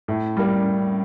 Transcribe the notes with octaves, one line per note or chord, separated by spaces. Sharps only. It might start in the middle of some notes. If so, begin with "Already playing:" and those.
A2
G3 A#3